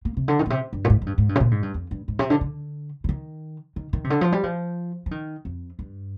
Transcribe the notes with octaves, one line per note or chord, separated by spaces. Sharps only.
A#3
C3
D3
D#3
A#2
C3
G2
A#2
G#2
G#2
G2
G#2
G2
C3
A#2
G#2
G2
F2
G2
G#2
C3
D3
D3
D3
D#3
D#3
D#3
C3
D3
F3
G3
F3
F3
D#3
F2
G2